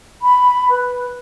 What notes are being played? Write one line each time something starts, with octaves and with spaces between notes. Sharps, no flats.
B5
B4